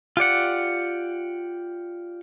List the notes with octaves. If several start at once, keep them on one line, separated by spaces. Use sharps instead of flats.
F4 G4 D5 F#5